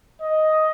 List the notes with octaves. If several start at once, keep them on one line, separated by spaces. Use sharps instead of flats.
D#5